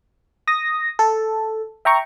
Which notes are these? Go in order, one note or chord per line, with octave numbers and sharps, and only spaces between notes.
D#6 A#6
A4
E5 G5 A#5 C#6